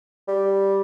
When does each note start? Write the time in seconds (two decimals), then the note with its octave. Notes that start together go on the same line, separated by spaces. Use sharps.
0.28 G3